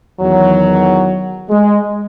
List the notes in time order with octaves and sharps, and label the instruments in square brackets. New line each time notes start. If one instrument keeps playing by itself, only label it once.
[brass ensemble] E2 D#3 F#3
G#3